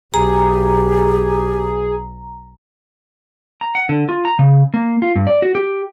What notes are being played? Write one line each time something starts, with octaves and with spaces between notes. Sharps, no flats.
B1 G4 G#4 A#5
A#5
F#5
D3
F4
A#5
C#3
A#3
F4
G2
D5
F#4
G4